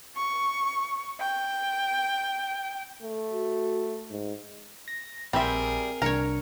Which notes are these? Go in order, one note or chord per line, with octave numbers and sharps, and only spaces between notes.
C#6
G5
A3
F#4
G#2
A#6
A#1 G3 C4 G#4 A#4 E5
C2 D4 A#4 C#5 A#5 C#7